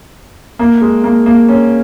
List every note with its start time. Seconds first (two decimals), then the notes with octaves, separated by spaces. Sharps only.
0.59 A#3
0.82 G#3
1.04 A#3
1.26 A#3
1.49 C#4